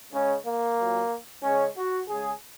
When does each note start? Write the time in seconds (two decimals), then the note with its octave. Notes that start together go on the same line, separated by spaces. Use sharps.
0.12 C#3 G#3 C#4
0.45 A#3
0.78 A#2 F#3
1.43 C#3 G#3 C#4
1.76 F#4
2.08 C#3 G#3 G#4